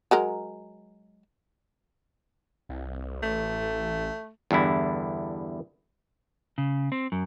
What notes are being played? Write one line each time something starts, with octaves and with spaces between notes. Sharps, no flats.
F#3 G#3 A#4
C2
A1 A3
E2 G2 D3 E4
C#3
C4
F#2